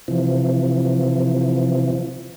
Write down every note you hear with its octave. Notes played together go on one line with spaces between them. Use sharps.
C3 E3 F3